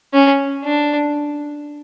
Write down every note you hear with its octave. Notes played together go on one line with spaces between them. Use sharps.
C#4
D4